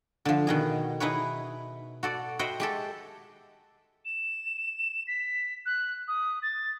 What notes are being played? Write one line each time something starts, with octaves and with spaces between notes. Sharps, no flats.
D3 F3
B2 D#3 G#4
D#4 E4 G#4 B4 C#5
F#4 A4 D5
F#4 C5 D#5 E5 F#5 G5
G#3 G4 A4
E7
B6
F#6
D#6
A6